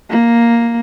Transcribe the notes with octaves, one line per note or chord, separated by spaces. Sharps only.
A#3